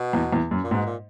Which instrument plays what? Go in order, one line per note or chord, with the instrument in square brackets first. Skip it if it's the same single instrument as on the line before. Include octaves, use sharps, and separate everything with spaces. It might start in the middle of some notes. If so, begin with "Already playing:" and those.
Already playing: [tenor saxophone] B2
[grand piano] E2
E2
F#2
[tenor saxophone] A#2
[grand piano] G#2 [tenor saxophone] B2
[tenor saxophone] A#2